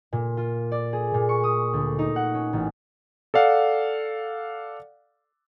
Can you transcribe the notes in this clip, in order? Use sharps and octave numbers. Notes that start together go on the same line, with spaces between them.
A#2
F4
D5
G#4
A#2
C#6
D#6
D2
D#4
F#5
C#4
A1
A4 D5 F5 F#5